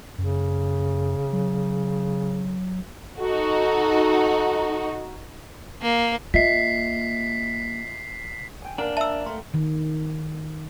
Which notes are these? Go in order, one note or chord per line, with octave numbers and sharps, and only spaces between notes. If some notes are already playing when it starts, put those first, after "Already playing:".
F#2 C#3
F#3
D#4 F#4 A4
A#3
A#3 F4 D#5 E5 B6 C7
G5 G#5
A#3 D4 A#4 F#5 G5
E5 A5 E6
A3 A#5 C6
D#3